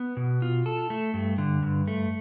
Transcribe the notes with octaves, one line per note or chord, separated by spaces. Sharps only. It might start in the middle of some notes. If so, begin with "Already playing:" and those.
Already playing: B3
B2
F4
A4
A3
G2
D3
G2
A3